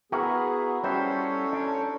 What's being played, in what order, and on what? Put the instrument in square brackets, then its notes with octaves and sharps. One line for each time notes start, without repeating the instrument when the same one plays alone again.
[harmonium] B3 G#4 [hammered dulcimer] E4 A#4 B4 [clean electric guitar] F#4
[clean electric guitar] G3 [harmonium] C#4 A4 C#5 [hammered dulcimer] F#4 C5 E5
[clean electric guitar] D4